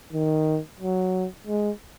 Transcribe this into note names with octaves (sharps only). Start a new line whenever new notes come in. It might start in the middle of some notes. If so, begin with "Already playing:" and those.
D#3
F#3
G#3